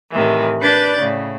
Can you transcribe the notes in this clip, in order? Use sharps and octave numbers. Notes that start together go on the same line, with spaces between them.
A2 C3 D#3 E3
D4 B4 D5 F#6 G6 A6
A2 C#3